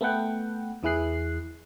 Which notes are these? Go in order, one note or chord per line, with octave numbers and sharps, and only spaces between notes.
A3 B3 A4 B4 F#5 G5
E2 E3 E4 G#4 F#6 C7